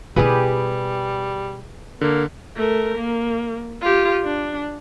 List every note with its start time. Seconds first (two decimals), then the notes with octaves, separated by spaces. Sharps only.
0.16 B2 G3 E4 G4 G#4 B4
2.01 D3 A#3
2.56 A3 A#4
2.97 A#3
3.82 F4 G4
4.23 D4